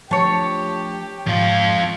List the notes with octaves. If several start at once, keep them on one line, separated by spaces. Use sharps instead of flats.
F3 A3 D4 G4 C#5 A5
F2 G#2 F4